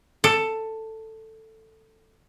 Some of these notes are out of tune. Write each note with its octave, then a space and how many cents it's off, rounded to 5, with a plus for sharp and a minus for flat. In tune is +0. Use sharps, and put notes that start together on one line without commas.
A4 +10